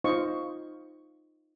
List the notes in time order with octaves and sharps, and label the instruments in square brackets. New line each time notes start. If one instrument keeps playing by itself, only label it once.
[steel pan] D#4 F4 C5 D#5 F5 C#6